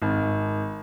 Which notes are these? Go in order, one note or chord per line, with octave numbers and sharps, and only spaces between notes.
G#1